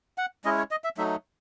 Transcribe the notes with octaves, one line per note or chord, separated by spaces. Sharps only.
F#5
G#3 C#4 E4 D#5
C#5
D#5
E5
F#3 A3 D#4 E5